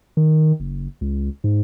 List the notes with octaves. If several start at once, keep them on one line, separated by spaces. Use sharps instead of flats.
D#3
F#1
C#2
G#2